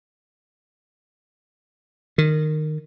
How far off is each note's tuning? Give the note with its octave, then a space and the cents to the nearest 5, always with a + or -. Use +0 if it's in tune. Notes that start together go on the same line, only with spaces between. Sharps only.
D#3 -15